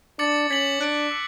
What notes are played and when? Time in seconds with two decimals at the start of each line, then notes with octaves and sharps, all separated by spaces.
0.19 D4 D6 A6 C#7 F#7
0.50 C#4 G#6 B6 F#7
0.81 D4 F#6 A6 D7 F#7
1.11 E6 A6 C#7